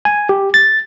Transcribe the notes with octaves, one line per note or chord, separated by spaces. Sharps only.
G#5
G4
A6